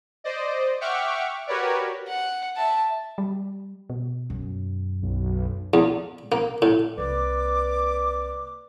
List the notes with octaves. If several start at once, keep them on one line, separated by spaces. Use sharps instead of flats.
C5 D5 D#5
E5 F#5 G5 C#6 D6 F6
F#4 G4 A#4 B4 C#5 D5
F#5
E5 A5
G3
B2
F#2
B1
E2
A#3
A2
C2 A#3 B4 D5 D6